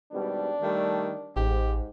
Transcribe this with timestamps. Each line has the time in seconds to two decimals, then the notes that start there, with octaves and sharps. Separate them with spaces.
0.12 G#1 B2 G3 D4
0.62 D#3 G3 A3
1.36 A1 G#2 G4